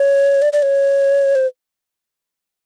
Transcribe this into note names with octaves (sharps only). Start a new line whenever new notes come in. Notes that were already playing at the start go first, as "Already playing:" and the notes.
Already playing: C#5
D5
D5
C#5
C5